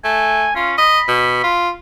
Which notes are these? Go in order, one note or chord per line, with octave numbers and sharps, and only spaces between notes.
A3 G#5
C#4 F4
D#5 B5
B2
F4